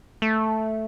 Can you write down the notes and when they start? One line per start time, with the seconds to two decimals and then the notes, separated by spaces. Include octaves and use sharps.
0.22 A3